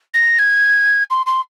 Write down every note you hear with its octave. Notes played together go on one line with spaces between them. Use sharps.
A#6
G#6
C6
C6